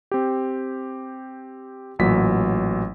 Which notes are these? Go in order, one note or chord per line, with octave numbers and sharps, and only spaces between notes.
C4 G4
A1 A#2 F#3 B6